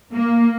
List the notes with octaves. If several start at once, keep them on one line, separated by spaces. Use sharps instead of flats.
A#3